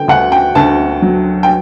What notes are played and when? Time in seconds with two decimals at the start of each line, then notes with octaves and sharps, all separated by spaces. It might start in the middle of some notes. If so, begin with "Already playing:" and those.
Already playing: D3 G5
0.08 D2 F#5
0.32 G5
0.55 D2 A5
1.02 F#3
1.43 G5